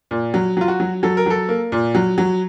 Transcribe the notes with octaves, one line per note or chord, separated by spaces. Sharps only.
A#2
F#3
F#3 F4
F#4
F#3
F#3 A4
A#4
F#3 A4
A#3
A#2
F#3
F#3